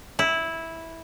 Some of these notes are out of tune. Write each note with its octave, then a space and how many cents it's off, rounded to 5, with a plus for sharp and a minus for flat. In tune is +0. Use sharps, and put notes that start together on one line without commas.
E4 -10